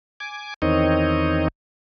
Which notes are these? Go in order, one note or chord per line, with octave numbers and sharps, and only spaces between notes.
G#5 D6
E2 D#3 C4 D#4 C#5 D#5